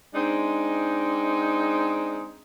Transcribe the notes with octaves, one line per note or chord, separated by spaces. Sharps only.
G#3 C4 D4 D#4